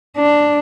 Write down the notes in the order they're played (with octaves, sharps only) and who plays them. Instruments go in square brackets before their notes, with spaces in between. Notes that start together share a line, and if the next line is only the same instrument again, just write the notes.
[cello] D4